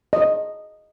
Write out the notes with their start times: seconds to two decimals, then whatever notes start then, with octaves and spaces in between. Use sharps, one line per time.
0.13 D#5